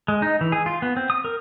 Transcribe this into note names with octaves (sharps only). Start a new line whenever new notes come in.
G#3
D#4
E3
G#4
F4
B3
C4
D#6
A#4